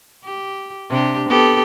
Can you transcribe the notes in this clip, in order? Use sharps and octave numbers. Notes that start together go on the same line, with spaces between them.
G4
C3 D4 G4
B3 G4 A4